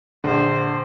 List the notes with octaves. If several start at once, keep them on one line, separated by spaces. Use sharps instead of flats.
A#1 D3 C5